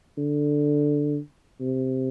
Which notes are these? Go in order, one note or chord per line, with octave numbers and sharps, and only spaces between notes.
D3
C3